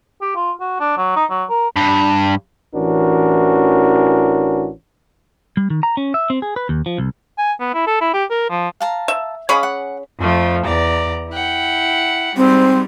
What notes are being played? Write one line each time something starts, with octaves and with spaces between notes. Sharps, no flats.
G4
F4
F#4
D4
F#3
D#4
F#3
A#4
G2
A1 E3 C#4 D4 F#4 A#4
G3
D#3
A#5
C#4
E5
C4
G#4
B4
D#2
F3
C2
G#5
B3
E4
A4
E4
G4
A#4
F3
F5 A5 A#5
E5
C#4 G#4 D#5 F5 B5 D6
F#5
F2 F3 A3
E2 D5 A#5
E4 F#5 G5
G#2 G3 C4